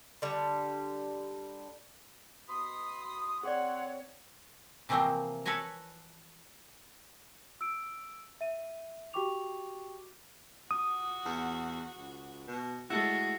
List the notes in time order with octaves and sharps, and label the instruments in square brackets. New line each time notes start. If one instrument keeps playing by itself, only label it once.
[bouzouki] D3 G3
[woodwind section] B2 B5 D#6 [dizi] C6
[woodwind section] C4 C#5 [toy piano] G#4 D5 [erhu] F#5 [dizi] C6
[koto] C3 E3 F3 A3 A#3 C4
A4 B4 C#5 G#5 A#5
[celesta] E6 D7
E5 D#7
F#4 G4 G5 C#6 D6 F7
[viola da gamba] F#4 [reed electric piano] D#6
[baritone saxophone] E2
C#2
B2
[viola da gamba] G#3 A3 [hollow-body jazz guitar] E4 A4 [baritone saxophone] F#4